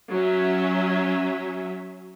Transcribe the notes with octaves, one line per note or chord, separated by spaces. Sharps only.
F#3 C#4 E5